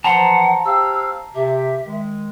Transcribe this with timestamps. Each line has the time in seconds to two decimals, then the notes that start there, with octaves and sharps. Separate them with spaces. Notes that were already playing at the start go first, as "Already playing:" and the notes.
0.04 E3 F3 C5 F#5 A5 A#5 C6
0.65 G4 C5 F5 E6
1.35 C3 G4 E5
1.86 D#3 G#3